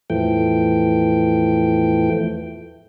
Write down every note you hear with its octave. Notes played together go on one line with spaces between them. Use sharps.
E2 A2 E3 F3 A3 G5